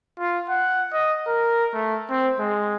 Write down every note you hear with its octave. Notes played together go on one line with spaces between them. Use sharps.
F4
F#5
D#5
A#4
A3
C4
G#3